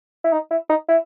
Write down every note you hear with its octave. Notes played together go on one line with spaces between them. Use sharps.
E4
D#4
E4
D#4
E4